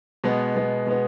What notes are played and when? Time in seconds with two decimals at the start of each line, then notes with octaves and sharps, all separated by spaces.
0.24 B2 G#3 B3
0.55 B2 G#3 B3
0.87 B2 G#3 B3